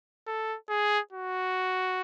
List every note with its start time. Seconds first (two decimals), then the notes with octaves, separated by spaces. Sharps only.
0.27 A4
0.69 G#4
1.12 F#4